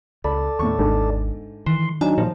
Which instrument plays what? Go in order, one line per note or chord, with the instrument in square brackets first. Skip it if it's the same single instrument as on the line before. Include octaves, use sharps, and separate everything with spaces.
[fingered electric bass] C#2 [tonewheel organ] A4 D5 [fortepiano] B5
[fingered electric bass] D#2 B3 [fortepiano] A2 C#6
[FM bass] G#1 [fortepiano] G#2 D3 A3
[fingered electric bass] D#3 [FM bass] E3 [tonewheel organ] C6
[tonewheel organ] F#3 D#4 [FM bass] D4 [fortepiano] G#5
[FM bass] A#2 [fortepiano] F3